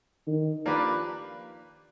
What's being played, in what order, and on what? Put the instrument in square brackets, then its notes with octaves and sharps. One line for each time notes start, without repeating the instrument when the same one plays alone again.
[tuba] D#3
[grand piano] F3 A#3 D4 G4 B4